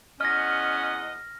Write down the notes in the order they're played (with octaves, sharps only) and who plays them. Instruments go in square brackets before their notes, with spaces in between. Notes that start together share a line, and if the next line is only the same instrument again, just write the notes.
[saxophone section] E2 D#5 [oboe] C#4 [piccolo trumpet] F#5 [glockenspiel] F6 A#6